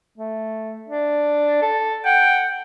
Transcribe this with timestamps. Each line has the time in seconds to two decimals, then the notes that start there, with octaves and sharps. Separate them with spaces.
0.18 A3
0.88 D4
1.62 A4
2.05 F#5 G5